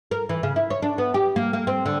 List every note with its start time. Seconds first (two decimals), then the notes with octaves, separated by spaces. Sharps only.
0.11 A#4
0.29 E3
0.43 C#3
0.56 E4
0.70 C#5
0.82 D4
0.98 B3
1.14 G4
1.36 A#3
1.53 A#3
1.67 C4
1.86 D3